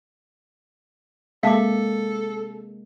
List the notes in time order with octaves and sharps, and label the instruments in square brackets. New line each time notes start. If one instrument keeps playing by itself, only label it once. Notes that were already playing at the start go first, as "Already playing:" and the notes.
[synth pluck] C3 G#3 A#3 [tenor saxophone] A4 [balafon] E5 A5 [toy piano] F5 D6